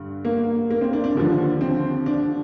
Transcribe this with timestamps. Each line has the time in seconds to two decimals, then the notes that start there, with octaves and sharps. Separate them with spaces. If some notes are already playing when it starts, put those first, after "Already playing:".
Already playing: G2 D3
0.25 A#3
0.71 A#3
0.81 C4
0.93 D4
1.04 D4
1.15 D#2 D3 F3
1.61 C4
2.06 D4